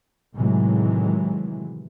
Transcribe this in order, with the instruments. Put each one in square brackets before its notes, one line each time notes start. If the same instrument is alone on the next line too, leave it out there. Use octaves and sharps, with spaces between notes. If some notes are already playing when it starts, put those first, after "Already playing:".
[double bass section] A2 C3 D#3 E3 F#3 G#3